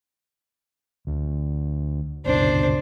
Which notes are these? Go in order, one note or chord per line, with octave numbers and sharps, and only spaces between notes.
D2
F#1 C#2 B2 D4 C5